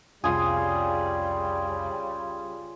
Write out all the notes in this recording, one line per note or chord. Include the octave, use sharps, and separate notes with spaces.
C2 F2 C#3 G3 F4 G#4